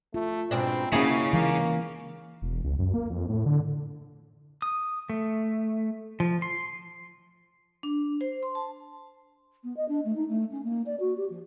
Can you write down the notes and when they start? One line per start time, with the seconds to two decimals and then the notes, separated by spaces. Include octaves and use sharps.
0.14 A3 F4
0.51 G#2 B2 C4 D4
0.92 F#2 C#3 A#3 C#4 D#4 E4 G#4
1.33 E3 G#3 A#3
2.42 E1
2.64 C#2
2.79 F#2
2.94 A#3
3.10 F2
3.29 A2
3.46 D3
4.62 D#6
5.10 A3
6.20 F3
6.42 C6
7.83 D4
8.21 C5
8.43 C6
8.55 A5
9.64 B3
9.77 D#5
9.89 D4
10.05 A3
10.16 D#4
10.29 A3
10.52 C#4
10.64 A#3
10.86 D5
11.00 F#4
11.18 G4
11.30 F3